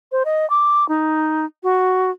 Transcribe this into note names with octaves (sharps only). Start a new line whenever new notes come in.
C5
D#5
D6
D#4
F#4